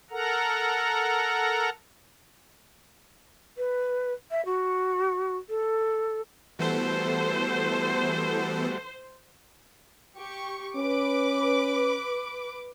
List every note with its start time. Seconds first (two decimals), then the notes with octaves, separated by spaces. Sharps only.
0.11 A4 A#4 F#5 A#5
3.57 B4
4.31 E5
4.45 F#4
5.49 A4
6.59 E3 G3 A3 B3 F#4 A4 C5
10.17 G4 C#6
10.76 C#4 B4 D6